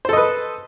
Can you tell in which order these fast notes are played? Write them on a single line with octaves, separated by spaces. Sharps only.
C5 A4 D#5 B4